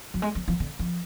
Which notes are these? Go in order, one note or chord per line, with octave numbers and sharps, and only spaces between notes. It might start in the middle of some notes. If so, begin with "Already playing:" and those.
F#3
G#3
F#3
F3
D3
F3